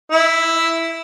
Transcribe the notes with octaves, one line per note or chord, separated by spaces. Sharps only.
E4